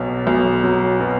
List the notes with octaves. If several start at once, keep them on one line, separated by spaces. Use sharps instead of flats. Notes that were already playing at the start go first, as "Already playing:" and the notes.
Already playing: B1 B2 F#3
B1
F#3
B2